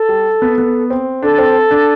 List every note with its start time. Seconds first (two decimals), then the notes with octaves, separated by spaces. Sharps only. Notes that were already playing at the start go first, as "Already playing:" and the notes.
Already playing: A4
0.09 G3
0.42 B3
0.58 B3
0.90 C4
1.23 D4 A4
1.38 C4
1.71 D4